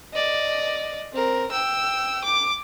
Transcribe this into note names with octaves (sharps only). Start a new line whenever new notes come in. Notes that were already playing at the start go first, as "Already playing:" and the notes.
D5 D#5
C4 A#4
G5 E6
D6